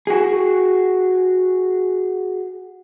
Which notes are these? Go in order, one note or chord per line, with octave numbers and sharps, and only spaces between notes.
F#4 G#4